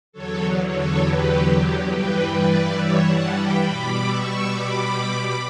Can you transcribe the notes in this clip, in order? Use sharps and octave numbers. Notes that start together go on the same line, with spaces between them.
E2 D3 F#3 A4 C#5
A4 C#5
G4 B4
G4
G2 E3 G3 G4 B4
B4 D5
C#5 E5
F#5 A5
G5 B5
B2 G3 B5 D6
C#6 E6
B5 D6